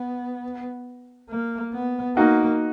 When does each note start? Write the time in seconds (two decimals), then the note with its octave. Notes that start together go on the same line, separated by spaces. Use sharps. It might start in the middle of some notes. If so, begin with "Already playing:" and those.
Already playing: B3
1.30 A#3
1.73 B3
2.16 A#3 D#4 F#4